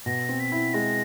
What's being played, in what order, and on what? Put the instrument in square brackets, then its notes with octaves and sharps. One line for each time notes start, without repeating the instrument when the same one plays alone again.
[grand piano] B2 [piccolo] A#6
[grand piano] C4
[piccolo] B6
[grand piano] E4
[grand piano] G#3 [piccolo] A#6